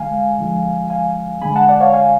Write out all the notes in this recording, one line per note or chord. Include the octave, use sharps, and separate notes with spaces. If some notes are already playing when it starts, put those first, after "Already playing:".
Already playing: D3 G#3 F5 G#5
D3 F3 G#3
F5 G#5
D3 G#3 G#5 B5
F#5 A5
D5 F#5
C#5 F5
F5 G#5